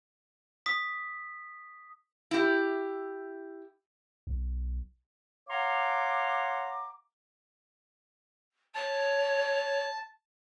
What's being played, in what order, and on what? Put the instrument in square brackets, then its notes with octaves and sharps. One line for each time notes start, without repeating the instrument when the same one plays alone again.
[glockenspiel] D#6 B6
[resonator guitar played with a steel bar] E4 G4
[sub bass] B1
[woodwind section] C#5 F5 F#5 A#5 C6 D6
[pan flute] C#5 [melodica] A5